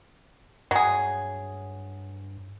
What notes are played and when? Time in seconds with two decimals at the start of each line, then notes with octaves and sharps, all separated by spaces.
0.71 G2 F#3 G#4